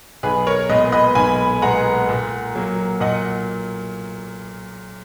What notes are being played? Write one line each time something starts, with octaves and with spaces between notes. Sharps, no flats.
B1 G#4 B4
A#4 C#5
A#2 G#3 B3 B4 D#5
B4 D#5
B1 G#5 B5
A#2 G#3 B3 F#5 A#5
A#2
F#3 A#3
A#2 D#5 F#5